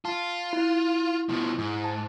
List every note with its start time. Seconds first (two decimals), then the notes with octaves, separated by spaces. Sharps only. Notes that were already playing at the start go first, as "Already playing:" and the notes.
0.05 F4 A5
0.53 E4
1.29 B2 F3
1.58 G#2
1.84 A5